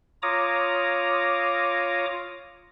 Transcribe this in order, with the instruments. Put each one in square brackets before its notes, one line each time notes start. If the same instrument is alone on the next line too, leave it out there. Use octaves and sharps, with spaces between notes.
[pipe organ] F4 C#5 A#5 D6 D#6